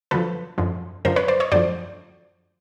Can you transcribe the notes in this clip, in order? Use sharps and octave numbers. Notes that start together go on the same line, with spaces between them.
F#2 D3 F3 A4 B4
F#2 D3 F3
F#2 D3 F3 A#4 C5
B4 C#5
C5 D5
C#5 D#5
F#2 D3 F3 C5 D5